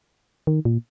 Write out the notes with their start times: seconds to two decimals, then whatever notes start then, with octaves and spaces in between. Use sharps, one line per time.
0.47 D#3
0.65 A#2